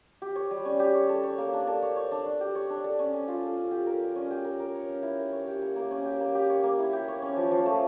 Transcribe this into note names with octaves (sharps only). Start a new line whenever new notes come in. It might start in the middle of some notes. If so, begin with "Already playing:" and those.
G4
C#5
G3
C#4
G4
C#5
A4
C#5
A#3
D4
A4
C#5
C#5
D4
D4
G4
C#5
D4
A4
C#4
C#4
F4
A4
C#4
G4
A#4
G3
C#4
G4
A#4
A#4
C#5
C#4
E4
A#4
C#5
G4
A#3
A#3
C#4
G4
A#3
G4
C#5
A#3
E4
G4
C#5
C#4
F3
F3
A3